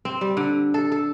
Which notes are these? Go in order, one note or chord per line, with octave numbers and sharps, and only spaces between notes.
C4
G3
D3
A4
A4